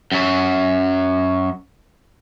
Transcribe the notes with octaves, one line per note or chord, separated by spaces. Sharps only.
F#2 F#3